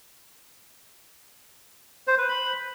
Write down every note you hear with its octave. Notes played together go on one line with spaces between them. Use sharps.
C5
B4
B5